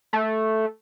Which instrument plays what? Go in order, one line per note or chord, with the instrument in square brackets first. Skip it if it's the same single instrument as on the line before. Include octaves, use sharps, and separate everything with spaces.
[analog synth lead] A3